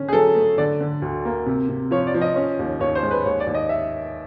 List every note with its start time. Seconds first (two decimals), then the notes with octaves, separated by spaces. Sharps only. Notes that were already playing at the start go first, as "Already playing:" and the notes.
Already playing: D3 C#4
0.08 G#4
0.13 F#3 A4
0.35 A3
0.58 D3 D5
0.80 D3
1.02 D2
1.25 A#3
1.46 C3
1.69 C3
1.91 F3 C#5
2.07 D5
2.14 F3
2.21 D#5
2.35 C#4
2.59 D#2
2.80 D#2 C#5
2.95 C5
3.03 G#3
3.11 B4
3.25 D#2 C#5
3.40 D5
3.47 D#2
3.54 D#5
3.69 E5